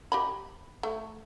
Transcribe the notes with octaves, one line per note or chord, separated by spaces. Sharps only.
G4 D#5 B5
A3